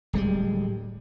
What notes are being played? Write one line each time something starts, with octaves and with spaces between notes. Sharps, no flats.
D1 G3 G#3